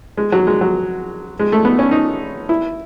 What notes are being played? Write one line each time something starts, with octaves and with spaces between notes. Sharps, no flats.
G#3
F#3
G#3
F#3
G#3
A3
B3
C#4
D#4
E4